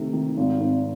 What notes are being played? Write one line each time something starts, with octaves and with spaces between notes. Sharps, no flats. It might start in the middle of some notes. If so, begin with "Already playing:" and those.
Already playing: C3 D#3 A3
D#3
G#1
G#1